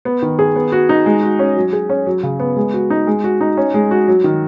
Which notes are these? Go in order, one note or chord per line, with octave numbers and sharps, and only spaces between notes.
B3
D#3
G#4
B3
F#4
D#4
G#3
F#4
C#4
F#3
G#4
C#4
F#3
C#3
B3
G#3
F#4
D#4
G#3
F#4
D#4
C#4
G#3
F#4
F#3
D#3